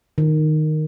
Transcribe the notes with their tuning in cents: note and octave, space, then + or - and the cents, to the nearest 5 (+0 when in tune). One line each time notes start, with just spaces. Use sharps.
D#3 -10